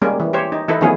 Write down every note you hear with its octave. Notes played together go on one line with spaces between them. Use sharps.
G3 G#3 A#3 C#4
E3
G4 C5 C#5
D#4
E3 D#4 E4 A4 B4
D#3 F3 A3 B3 C#4 G#4